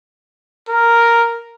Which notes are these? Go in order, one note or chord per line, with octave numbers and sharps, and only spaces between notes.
A#4